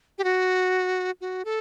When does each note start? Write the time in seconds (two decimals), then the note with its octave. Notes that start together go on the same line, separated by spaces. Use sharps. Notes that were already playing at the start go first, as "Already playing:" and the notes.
0.18 G4
0.24 F#4
1.21 F#4
1.45 A4